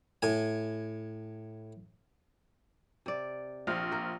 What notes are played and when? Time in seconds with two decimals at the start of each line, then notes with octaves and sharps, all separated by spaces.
0.22 A2 G#5
3.06 C3 D5
3.67 A#1 C5 F5 F6
3.91 A#3 A#4